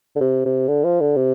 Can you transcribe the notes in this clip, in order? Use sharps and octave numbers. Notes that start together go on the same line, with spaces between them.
D3
C3
C3
D3
F3
D3
C3